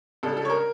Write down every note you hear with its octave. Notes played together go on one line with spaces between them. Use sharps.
C#2 C#3 G3 D4 A4
A4
C#5
A#4